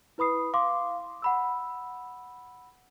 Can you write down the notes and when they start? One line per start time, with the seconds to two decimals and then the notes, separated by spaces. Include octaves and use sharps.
0.18 E4 B4 B5 D#6 C7
0.54 F5 C6 D6
1.22 F#5 B5 E6